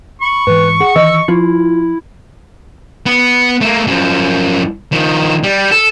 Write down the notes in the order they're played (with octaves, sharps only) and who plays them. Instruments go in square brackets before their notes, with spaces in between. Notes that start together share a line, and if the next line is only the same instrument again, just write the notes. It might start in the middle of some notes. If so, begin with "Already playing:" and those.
[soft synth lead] B5 [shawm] C#6
[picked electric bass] G#2 E3 [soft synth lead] B4
[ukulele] G#4 [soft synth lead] F#5
[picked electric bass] D#3 E3 [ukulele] D#5 [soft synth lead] E6
[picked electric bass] F3 [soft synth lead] E4 [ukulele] F4
[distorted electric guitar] B3
A3 A#3
F#2 F3
D#3 F3
G3
A4